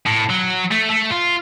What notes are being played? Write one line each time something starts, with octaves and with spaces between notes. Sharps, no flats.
A2
F#3
A3
A3
F4